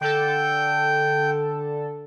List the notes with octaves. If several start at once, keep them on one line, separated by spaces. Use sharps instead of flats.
D3 A4 G5